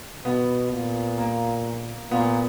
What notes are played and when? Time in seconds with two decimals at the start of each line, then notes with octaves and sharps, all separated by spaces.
0.25 B2 B3
0.72 A#2
1.18 A#3
2.11 A#2 B3